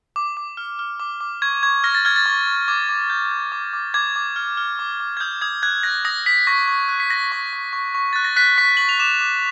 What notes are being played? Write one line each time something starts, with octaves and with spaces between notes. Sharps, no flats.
D6
D6
F6
F6
D6
D6
C#6 G#6
C#6 G#6
F6 A#6
A6
F6 G#6
A6
C#6
C#6
D6 G#6
D6
G6
G6
D6
D6
D6 G#6
D6
F6
F6
D6
D6
G#6
D#6 G6
D#6 G#6
F#6 G#6
F#6 A#6
D#6 A#6
D#6 B6
C#6 A#6
C#6
F#6
B6
F#6 A#6
C#6
C#6
C#6
C#6
F#6 A6
A#6
F#6 B6
C#6 B6
C#6 F#7
F7
D6 E7
D6